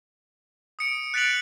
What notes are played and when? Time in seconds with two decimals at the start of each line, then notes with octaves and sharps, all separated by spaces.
0.79 D#6 C#7 D7
1.14 F#6 A6 B6 D7 F7 F#7